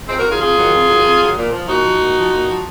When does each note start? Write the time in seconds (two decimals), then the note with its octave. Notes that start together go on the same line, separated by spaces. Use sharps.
0.08 F2 G#3 C4
0.18 F#4 A#4
0.24 D#3 F#3
0.29 F4 G#4
0.40 F2 F4 G#4
0.57 D#3 F#3
0.72 F2
0.89 D#3 F#3
1.04 F2
1.20 D#3 F#3
1.36 A#2
1.52 F3
1.68 A#2 D#4 F#4
1.84 F3
2.00 A#2
2.17 F3
2.32 A#2
2.49 F3